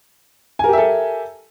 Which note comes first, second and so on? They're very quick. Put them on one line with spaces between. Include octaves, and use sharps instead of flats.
G#5 A#4 G4 E5 A4